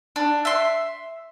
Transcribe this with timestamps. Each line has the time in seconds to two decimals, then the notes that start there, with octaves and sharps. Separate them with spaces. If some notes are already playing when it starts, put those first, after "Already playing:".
0.16 D4
0.45 E5 C6